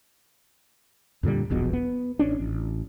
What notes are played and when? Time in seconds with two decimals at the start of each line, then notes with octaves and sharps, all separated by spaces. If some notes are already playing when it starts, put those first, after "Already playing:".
1.23 F2 A#2 D3 G3
1.50 D#1 A#1 E2 B2
1.73 B3
2.19 A1 C#4 D4
2.40 A1